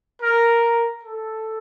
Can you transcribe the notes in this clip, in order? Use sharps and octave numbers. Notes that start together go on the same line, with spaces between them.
A#4
A4